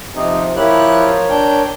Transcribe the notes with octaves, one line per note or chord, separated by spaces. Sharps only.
C3 F3 D#4
F3 E4 G4 A#4 C#5 F#6
D4 G5